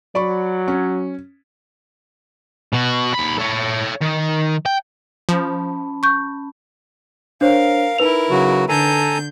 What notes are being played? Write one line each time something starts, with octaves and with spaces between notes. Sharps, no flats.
F#3 D5 B5 C#6
C#4
B2 F#4
D#2 B5
A4 C#5
D#3
G5
F3 C#4 A5 B5
C#6 G6
D4 A#4 C5 C#5 F5
D#4 E4 A#4 B4 F7
C#3 F#3 F#4
D3 A4 G#5 A#5 G6